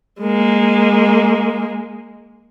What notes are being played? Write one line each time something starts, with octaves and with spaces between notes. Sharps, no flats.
G#3 A#3